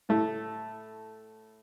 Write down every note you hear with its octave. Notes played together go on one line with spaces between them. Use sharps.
A2 A3